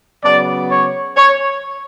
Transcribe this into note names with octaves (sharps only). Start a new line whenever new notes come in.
C#3 F#3 B3 D5
C#5
C#5